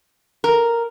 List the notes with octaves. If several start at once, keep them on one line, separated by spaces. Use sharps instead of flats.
A#4